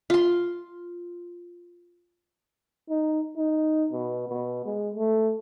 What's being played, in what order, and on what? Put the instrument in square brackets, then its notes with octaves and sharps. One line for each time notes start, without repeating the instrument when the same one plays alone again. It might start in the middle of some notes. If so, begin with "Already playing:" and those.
[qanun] F4 C6
[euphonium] D#4
D#4
B2
B2
G#3
A3